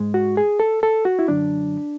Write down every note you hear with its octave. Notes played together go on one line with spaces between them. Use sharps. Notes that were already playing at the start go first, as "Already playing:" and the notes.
Already playing: G#2 G#3
F#4
G#4
A4
A4
F#4
E4
F#2 D3 F#3 D4